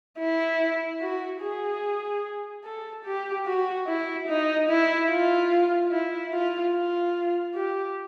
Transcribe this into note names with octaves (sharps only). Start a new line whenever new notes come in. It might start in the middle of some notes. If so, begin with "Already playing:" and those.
E4
F#4
G#4
A4
G4
F#4
E4
D#4
E4
F4
E4
F4
F4
G4